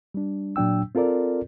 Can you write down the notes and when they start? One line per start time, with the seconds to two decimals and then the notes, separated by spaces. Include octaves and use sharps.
0.14 G3 D4
0.56 A#2 F#3 D4 G5 E6
0.95 C4 F4 A4 A#4 D5